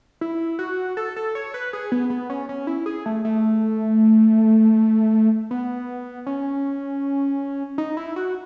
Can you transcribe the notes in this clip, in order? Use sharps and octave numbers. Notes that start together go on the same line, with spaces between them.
E4
F#4
A4
A4
C#5
B4
G#4
B3
B3
C#4
C#4
E4
G#4
A3
A3
B3
C#4
D#4
E4
F#4